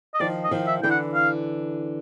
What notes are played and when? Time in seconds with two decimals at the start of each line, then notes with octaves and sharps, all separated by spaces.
0.14 D#5
0.20 D#3 F3 D5
0.44 D#5
0.51 D#3 F3
0.67 E5
0.83 D3 E3 G5
0.91 F#5
1.15 F5